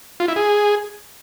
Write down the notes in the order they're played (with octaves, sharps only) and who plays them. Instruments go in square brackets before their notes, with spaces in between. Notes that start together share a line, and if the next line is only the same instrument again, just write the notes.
[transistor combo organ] F4
E4
G#4